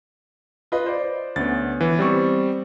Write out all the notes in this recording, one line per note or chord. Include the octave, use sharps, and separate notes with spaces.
F4 B4 D#5
C5 D5
D2 B3 C#4 A6
E3
G3 C4 C#6